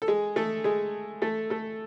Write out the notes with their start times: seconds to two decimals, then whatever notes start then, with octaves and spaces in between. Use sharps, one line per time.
0.02 A4
0.08 G#3 G#4
0.36 A3 A4
0.64 G#3 G#4
1.22 A3 A4
1.50 A3 A4